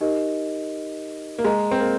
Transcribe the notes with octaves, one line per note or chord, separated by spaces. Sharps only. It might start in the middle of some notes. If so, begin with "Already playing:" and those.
D#4 G4 A#4 D#5
A#3
G#3 G#4 D#5 A#5
C4
A#3